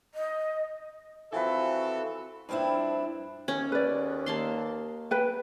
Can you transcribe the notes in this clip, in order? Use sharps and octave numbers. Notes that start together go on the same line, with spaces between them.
D#5
E3 F3 C4 F#4 A4 B4
G2 F3 C4 D4 E4
D#2 C#4
B4 D5
A#3 A5 C6
B4 G5